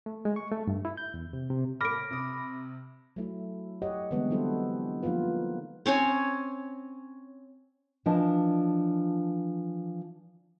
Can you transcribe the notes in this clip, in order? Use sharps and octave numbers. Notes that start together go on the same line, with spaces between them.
A3
G#3
C#6
A3
G2
E4
G6
E2
C3
C3
A2 A#3 B5 D6 F6 A#6 D7
C3 D#6
F#3 A3 E4
G4 C#5 D#5 F#5
D3 E3 G3 G#3 B3 C4
F#3 G3 E4 A4 C5
F3 A#3 D#4 F4 B4
C4 C#4 C#5 G#5
E3 F3 D4 D#5